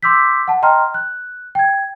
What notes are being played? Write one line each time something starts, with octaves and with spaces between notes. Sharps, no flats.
C6 D6 E6 G6 B6
F#5 A5
D#5 G5 A#5 C6 F6
F#6
G5 G#6